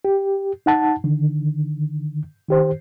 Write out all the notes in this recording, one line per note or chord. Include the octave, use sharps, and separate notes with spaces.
G4
D#4 F#5 A5
D3 D#3
D#3 G4 C5